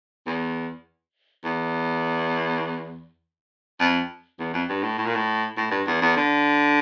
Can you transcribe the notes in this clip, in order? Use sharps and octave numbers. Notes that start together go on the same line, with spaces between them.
E2
E2
F2
E2
F2
G2
A2
A2
A#2
A2
A2
G2
E2
E2
D3